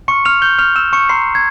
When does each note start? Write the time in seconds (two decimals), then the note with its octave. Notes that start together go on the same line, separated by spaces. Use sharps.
0.08 C6 C#6 F6 C#7
0.25 F6 F7
0.42 G6 G7
0.59 F6 F7
0.76 E6 E7
0.93 C#6 C#7
1.09 A#5 C6 C#6 F6 C7
1.35 G#6